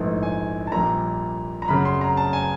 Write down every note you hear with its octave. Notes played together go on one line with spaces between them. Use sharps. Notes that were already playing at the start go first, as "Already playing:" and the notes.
Already playing: A#1 G#2 E3 A3
G#5
A5
A#1 A#2 G3 A#5
A#5
F#2 C#3 F#3 B5
C6
A#5
A5
G#5